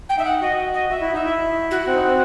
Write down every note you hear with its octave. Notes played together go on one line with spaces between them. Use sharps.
G5
D#4 E5
F#5
F#4 D#5
D#5
F#4 E5
E4
D#4 E5
E4
F#4
C4
D#4
C4